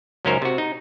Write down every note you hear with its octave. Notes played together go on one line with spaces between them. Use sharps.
C#2 F#2 C#4 D#4 A#4 C5
C3 F#4
D#4